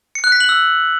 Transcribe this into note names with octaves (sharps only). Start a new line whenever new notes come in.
C#7
F#6
B6
F#7
E6